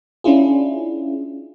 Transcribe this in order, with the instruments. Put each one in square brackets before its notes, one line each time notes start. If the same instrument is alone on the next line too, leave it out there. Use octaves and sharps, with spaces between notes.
[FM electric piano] C#4 D4 E4 F4 G#4